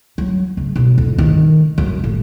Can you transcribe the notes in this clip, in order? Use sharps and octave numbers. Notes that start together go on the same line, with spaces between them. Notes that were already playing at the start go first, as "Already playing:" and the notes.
F#3
C#3
B1
F2
D#3
F#2
A1